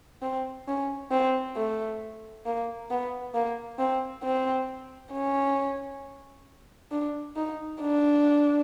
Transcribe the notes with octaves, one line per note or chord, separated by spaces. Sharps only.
C4
C#4
C4
A3
A#3
B3
A#3
C4
C4
C#4
D4
D#4
D4